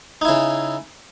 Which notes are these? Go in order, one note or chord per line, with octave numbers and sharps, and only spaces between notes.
C#3 D#4 E4